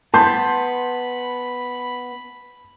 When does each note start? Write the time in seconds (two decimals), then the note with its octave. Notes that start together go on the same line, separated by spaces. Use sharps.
0.14 B3 A5 B5 C6 G6